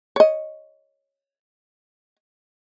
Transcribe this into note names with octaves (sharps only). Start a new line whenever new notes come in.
C#5 D#5